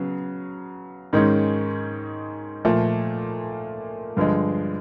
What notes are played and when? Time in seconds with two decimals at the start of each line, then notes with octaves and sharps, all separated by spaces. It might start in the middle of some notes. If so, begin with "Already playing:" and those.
Already playing: C#3 F#3 B3
1.13 G#2 D#3 G#3 C#4
2.65 A#2 F3 A3
4.17 G2 D3 F3 G#3